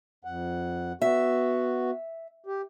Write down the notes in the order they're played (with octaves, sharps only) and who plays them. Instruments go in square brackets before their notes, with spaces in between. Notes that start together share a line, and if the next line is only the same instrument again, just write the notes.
[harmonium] F2 F#5
[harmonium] B3 F#4 [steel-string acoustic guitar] E5
[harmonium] G4